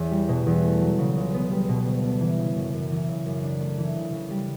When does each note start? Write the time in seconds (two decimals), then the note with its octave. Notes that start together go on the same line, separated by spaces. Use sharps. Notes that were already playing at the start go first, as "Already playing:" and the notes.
Already playing: E2 C#4
0.11 G3
0.29 B2
0.47 E2
0.64 A3
0.82 F#3
0.99 C#3
1.17 C#2
1.34 B3
1.51 G3
1.69 B2
1.86 D2
2.04 B3
2.21 E3
2.38 C#3
2.56 F#2
2.73 F#2
2.91 E3
3.08 C#3
3.26 F#2
3.44 D4
3.61 A3
3.78 E3
3.96 C#3
4.13 C#3
4.30 G3